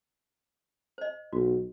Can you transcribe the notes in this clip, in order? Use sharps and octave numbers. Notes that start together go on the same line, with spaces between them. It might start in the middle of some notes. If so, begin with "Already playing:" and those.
C5 D#5
B1 F#4